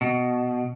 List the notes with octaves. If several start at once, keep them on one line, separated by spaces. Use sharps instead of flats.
B2